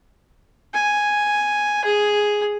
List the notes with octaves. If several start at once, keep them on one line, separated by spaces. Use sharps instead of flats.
G#5
G#4